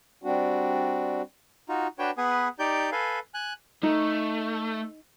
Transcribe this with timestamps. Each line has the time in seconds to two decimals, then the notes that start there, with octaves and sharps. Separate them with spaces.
0.24 G3 C4 D4 F#4
1.69 D#4 F4 F#4
1.99 D4 F#4 B4 C#5 G5
2.18 B3 G#4 B4 F#5 G#5
2.59 D#4 G4 D5 G6
2.92 A4 B4 F5 G#5
3.34 G#5 F#6
3.83 A3 D#4